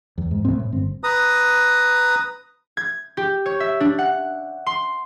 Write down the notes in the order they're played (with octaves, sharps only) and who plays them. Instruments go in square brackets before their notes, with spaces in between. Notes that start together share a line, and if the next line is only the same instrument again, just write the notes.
[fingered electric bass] E2
G#2
C2 F2 A3 C4
A2
G1 C4
[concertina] B4 A#5 D#6
[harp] G#6
G4
C#5
E5
D4
F#5
C6